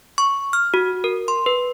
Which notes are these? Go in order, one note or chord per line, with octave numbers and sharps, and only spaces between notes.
C#6
F6
F#4
A#4
C6
B4